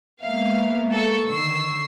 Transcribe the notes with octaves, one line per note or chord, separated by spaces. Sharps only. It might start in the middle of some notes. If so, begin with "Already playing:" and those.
G#3 A#3 B3 E5 F5
A4 C#6
D3 D#3 C#6 E6 C7